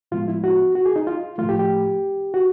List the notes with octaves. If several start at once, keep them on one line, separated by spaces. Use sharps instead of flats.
A2 F3 G#3 B3 F4
E4
F#4
F#4
G#4
D#4
F4
A2 F3 A3 F4
G4
G4
F#4